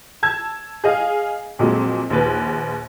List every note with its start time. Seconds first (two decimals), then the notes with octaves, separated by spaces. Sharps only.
0.23 A5 E6 G#6
0.84 G#4 D#5 F5
1.59 F2 A#2 F#3 G#3
2.10 A#1 D#2 B4